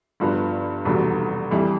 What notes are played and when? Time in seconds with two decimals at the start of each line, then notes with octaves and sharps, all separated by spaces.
0.20 G1 G2 F3 B3
0.85 F1 E2 B2 G3
1.51 F2 E3 G3